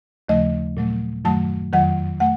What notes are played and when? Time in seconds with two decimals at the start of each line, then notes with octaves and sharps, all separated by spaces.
0.29 D#2 C#3 F3 A3 D#5
0.77 A#2 F#3 A3
1.25 F#2 D#3 F#3 A3 A5
1.73 F2 D#3 F#3 F#5
2.20 A3 F#5